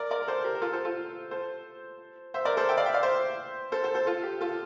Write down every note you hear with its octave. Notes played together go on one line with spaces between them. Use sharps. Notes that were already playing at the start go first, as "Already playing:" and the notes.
Already playing: A#4 D5
A#4 D5
A#4
A4 C5
G4 A#4
A#4
F4 A4
A4 C5
F4 A4
A4 C5
C5 E5
A#4 D5
A4 C5
E5 G5
D5 F5
E5 G5
D5 F5
C5 E5
A4 C5
A4 C5
A4 C5
F4 A4
G4
F4 A4